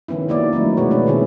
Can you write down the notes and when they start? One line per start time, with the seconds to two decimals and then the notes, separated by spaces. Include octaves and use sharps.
0.08 D#3 F3 B3 C#4 E4
0.29 D#3 F3 A#3 E4 F#4 D5
0.53 F#3 A3 C#4 D#4
0.77 B2 G#3 F#4 B4 C#5
0.91 F3 B3 C#4 D4 C#5
1.07 D3 D#3 B3 C4 E4 G#4